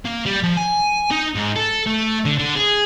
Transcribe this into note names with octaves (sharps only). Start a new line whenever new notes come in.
A#3
G3
F3
G#5
D#4
G#2
A4
A3
D3
D3
G#4